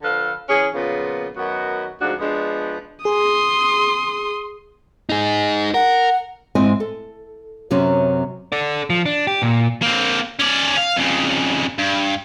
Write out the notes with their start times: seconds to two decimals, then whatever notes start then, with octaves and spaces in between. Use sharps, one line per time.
0.02 D3 F3 A4 B4 F5
0.49 E3 C#4 G#4
0.73 A#2 C#3 F3 A#3 B3
1.36 F#2 D#3 B3 F#4 F#5
2.01 D2 G#2 F3 D4 F#4
2.19 F3 G#3 B3 D4
3.05 G#4 C6 D#6
5.10 D#4 G#4
5.74 A#4 F#5
6.55 G#2 G#3 C4 E4 D#5 G#5
6.80 A4
7.71 F#2 C3 F#3 C4 C#4
8.52 A4 D5
8.90 F3
9.06 D4
9.27 G4
9.42 A#2
9.82 A#3 C4
10.39 C#4 D5
10.77 F5
10.96 F2 C#3
11.78 G2